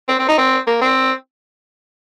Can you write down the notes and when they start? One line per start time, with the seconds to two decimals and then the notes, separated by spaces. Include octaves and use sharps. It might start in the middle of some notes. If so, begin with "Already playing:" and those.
0.08 C4
0.19 C4
0.28 D#4
0.38 C4
0.67 A#3
0.81 C4